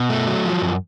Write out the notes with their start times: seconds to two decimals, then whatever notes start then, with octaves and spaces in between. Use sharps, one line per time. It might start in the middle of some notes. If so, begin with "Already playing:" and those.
Already playing: B2
0.10 A3
0.27 F#3
0.44 F3
0.62 F#2